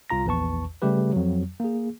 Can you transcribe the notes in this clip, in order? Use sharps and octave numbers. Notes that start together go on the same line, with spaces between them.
C2 F4 A#5 A#6
A#1 E2 B4 A5 C#6
C#3 G3 A3 G4 B4
F2 F#3
A#3 G#4